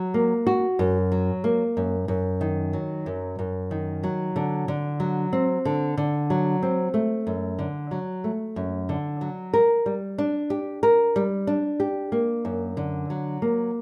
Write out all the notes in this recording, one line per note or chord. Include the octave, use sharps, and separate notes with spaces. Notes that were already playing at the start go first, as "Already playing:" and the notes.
Already playing: F#3
A#3
F#4
F#2
F#3
A#3
F#2
F#2
D#3
F#3
F#2
F#2
D#3
F#3
D3
D3
F#3
C4
D3
D3
F#3
C4
A3
F#2
D3
F#3
A3
F#2
D3
F#3
A#4
G3
D4
G4
A#4
G3
D4
G4
A#3
F#2
D3
F#3
A#3